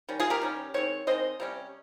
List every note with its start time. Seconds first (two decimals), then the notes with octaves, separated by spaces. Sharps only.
0.09 D#3 G3 C#4
0.20 F4 G#4
0.30 G4 A#4
0.42 D#3 G3 C#4
0.74 D#3 G#3 C4 C#5
1.07 D#3 G#3 C4 C5 D#5
1.40 C3 G3 C#4